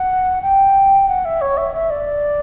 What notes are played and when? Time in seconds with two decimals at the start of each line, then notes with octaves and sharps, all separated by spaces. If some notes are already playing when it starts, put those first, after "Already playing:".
Already playing: F#5
0.42 G5
1.08 F#5
1.25 E5
1.41 C#5
1.57 E5
1.74 E5
1.90 D5